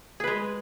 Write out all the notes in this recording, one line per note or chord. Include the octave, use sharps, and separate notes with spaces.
G#3 G#4 B4